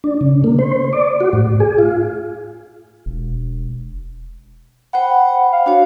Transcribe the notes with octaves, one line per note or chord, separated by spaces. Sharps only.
D4
C#3
A#3
C5
D5
F#4
A2
G#4
F4
E1
C5 F#5 G5 B5
F5
D4 F#4 C#5